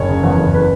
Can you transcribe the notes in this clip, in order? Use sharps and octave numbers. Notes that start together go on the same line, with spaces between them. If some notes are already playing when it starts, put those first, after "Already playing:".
Already playing: F#1 C#5
C#3
E2
F#1
B4